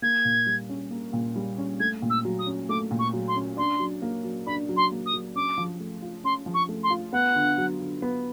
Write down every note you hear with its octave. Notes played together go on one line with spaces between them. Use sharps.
A#3 G#6
A#2
G3
C#4
A#3
A#2
G3
C#4
A3 G#6
A#2
E6
F#3
D#6
C#4
A3 D6
A#2
C#6
F#3
C6
C#4
D4 C6
F#3
A#3
F#3
D4 B5
F#3
C6
A#3
D#6
F#3
C#4 D6
F3
A3
F4
C#4 C6
F3
C#6
A3
C6
F4
B3 F#5
D3
F#3
D3
B3